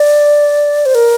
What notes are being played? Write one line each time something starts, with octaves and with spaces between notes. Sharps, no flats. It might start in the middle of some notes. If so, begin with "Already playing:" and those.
Already playing: D5
C5
A#4